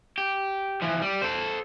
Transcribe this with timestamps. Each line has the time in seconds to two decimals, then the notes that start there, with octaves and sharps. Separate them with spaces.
0.18 G4
0.82 E3 F3
1.02 G3
1.22 A4 C5